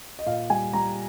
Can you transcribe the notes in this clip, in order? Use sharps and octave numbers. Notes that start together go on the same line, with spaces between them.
D#5
A#2 F5
G3 G#5
G3 A#5